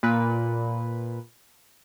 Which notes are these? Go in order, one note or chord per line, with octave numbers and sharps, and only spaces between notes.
A#2 B4